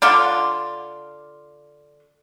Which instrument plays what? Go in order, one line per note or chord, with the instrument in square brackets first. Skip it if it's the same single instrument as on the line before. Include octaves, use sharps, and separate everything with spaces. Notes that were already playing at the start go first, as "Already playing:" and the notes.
[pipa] D3 D4 F4